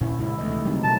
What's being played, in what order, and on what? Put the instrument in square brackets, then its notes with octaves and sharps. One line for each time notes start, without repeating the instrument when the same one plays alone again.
[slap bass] A#2 C#4 [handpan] E4
[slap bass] A#2 C#3 [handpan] G#3 E4
[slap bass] D2 E3 [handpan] C3 A3 D#5
[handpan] D#3
[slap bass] C#3 G3 [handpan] F#3 C4 D#4
[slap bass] B2 A3 [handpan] F#3 [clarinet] A5